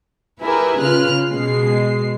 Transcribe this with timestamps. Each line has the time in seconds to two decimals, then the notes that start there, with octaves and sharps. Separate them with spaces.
0.43 E4 G4 G#4 A#4 B4 E5
0.80 C#3 F4 B4 F6 F#6
1.29 B2 G#3 C7